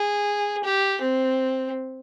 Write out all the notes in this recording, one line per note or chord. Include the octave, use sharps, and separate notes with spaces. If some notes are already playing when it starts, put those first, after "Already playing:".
Already playing: G#4
G4
C4